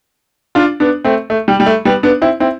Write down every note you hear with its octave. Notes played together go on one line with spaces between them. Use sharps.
D4 F4
B3 D4
A3 C4
A3
G3
G3
A3
G3 B3
B3 D4
C4 E4
C4 E4